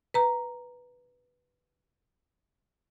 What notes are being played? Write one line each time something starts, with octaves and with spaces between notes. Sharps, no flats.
B4 A#5